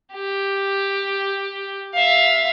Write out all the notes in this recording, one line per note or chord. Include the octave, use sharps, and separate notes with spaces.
G4
E5 F5